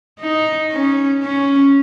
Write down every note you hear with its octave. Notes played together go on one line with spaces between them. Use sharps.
D#4
C#4
C#4